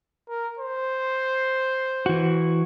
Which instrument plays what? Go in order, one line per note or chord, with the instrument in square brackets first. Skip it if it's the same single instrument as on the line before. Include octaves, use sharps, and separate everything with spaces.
[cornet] A#4
C5
[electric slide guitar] E3 F#4